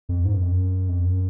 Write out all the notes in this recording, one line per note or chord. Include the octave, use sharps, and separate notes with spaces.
F2
G#2
F#2
F2
F#2
F2
F#2